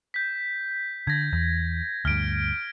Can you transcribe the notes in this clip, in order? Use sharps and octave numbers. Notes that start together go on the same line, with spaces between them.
G6 B6
D3 G#6 A#6
E2
D2 G2 F6 D7